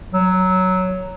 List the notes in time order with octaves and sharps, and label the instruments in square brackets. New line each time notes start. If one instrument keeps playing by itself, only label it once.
[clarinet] F#3